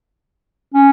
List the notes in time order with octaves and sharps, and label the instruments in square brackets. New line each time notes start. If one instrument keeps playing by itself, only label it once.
[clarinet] C#4